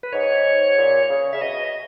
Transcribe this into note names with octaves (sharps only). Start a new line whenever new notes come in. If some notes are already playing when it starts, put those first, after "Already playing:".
B4
G#2 C#5
A#2
C#3
C#3 E5
B2 D#5